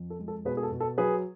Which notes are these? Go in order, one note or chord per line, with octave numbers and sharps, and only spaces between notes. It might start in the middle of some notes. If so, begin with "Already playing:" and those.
Already playing: F2
A4
G#3
A4
B2 G#4 B4
G#4
A4
B2
A4
F#3 G#4 B4